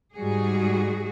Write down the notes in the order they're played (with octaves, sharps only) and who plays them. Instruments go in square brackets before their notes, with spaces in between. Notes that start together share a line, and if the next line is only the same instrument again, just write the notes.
[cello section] G#2 G3 F#4 G#4